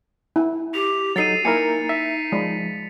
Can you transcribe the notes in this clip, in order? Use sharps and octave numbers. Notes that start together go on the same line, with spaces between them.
E4
G4 F7
F#3 D#4 A4 A6 C7 D#7
A#3 D#4 E4 A#4 G#5 C#7
E5 B6
F3 G#3 B5